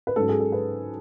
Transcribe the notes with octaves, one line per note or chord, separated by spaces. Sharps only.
B4
G#2 F#3 C#4 A4
G#4
A4
B4